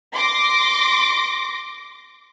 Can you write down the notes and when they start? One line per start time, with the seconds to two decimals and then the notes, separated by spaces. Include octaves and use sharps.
0.13 C6 D6 A#6